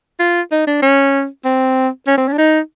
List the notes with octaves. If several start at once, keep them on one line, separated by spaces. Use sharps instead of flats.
F4
D#4
D4
C#4
C4
C#4
C4
C#4
D4
D#4